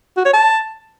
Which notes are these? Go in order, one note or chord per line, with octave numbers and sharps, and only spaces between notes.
F#4
C#5
A5